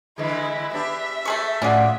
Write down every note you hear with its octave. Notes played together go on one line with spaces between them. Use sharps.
D3 E3 G#3 E4
B3 D4 G4 E5
A3 G#4 C#6
A2 C#4 F4 G#4 D5 F#5